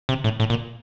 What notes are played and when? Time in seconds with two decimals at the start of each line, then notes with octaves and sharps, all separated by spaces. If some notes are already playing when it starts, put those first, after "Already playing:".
0.09 C3
0.24 A2
0.40 A2
0.50 A#2